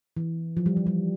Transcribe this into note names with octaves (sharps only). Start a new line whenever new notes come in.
E3
F3
G3
F3
G3